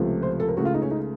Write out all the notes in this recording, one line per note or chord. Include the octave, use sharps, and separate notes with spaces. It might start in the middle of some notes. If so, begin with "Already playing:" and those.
Already playing: C#2 C3 F3 A3
C5
A4
A#4
C#2 C#3 A3 F#4
F4
D#4
C#4
D#4